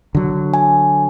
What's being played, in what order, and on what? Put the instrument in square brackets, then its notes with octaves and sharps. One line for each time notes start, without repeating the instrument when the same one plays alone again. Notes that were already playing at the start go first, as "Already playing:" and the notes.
[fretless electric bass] D3 F#3
[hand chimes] G#5